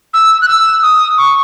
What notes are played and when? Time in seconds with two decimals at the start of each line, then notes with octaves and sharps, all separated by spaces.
0.14 E6
0.42 F#6
0.48 E6
0.83 D#6
1.18 C#6